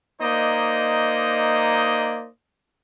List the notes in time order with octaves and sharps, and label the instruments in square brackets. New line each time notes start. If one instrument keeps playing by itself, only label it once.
[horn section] A#3 D#4 C5 D5 D#5